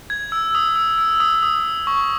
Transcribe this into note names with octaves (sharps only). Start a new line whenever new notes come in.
G#6
E6
D#6
E6
E6
D#6
D#6
C#6